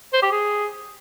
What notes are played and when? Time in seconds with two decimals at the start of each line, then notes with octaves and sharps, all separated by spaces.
0.13 C5
0.22 G4
0.32 G#4